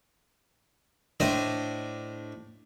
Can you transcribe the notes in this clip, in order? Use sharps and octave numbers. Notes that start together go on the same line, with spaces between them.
A2 D4 C5 D#5